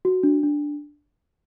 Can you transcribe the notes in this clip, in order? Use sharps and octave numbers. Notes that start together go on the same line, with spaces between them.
F#4
D4
D4